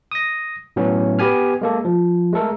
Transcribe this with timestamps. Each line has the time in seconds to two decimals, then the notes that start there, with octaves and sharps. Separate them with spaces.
0.11 D#6 A#6
0.76 A2 F#3 B3 C#4
1.19 B3 G4 G#5 F6
1.61 G#3 A#3 A4
1.85 F3
2.33 G#3 A3 A4 A#4